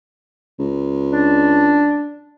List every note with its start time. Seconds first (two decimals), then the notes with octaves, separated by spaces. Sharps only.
0.59 C#2
1.12 D4